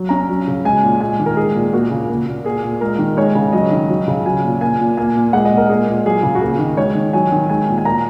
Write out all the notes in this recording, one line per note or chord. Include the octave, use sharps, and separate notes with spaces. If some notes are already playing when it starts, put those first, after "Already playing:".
Already playing: F#3
C#4 A#5
F#3
C#3
G#3 G#5
A#2
G#3 G#5
D#3
A#4
G#3 G#4
A#2
A#3 F#4
C#3
A#3
A#2
A#3 G#4
A#2
G#3 A#4
D#3
G#3 C#5
C#3
F#3 D#5
D#3
F#3
C#3
F#3 G#5
A#2
A#3 G#5
A#2
A#3 G#5
A#2
G#3 F#5
D#5
A#2
A#4
A#3 G#4
A#2
F#3 G#4
C#3
F#4
A#3 G#4
D#3
G#3 C#5
D#3
F#3 G#5
D#3
G#3 G#5
A#2
G#5
A#3 A#5